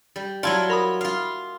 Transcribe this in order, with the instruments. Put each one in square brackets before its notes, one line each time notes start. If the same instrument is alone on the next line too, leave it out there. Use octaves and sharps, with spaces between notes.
[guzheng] G3
[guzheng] F#3 E4 F4 [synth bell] D5 A5 G#6
[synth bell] A#4 B5 D#6
[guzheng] F4 F5